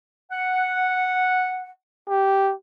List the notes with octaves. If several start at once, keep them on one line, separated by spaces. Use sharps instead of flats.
F#5
G4